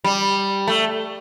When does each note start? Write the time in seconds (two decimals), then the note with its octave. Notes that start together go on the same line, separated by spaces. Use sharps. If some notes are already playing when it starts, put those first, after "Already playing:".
0.04 G3
0.67 A3